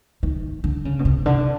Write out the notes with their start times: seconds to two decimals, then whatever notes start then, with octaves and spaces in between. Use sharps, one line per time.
0.23 D#3
0.64 D3
0.85 C#3
0.99 B2
1.05 C3
1.26 D3